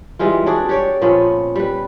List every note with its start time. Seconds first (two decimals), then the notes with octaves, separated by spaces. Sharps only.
0.19 E3 G3 G#3 F4
0.46 D4 F#4 G#4 D5
0.69 G4 C#5 D5
1.02 A#2 F3 B3 C#4
1.56 G3 B4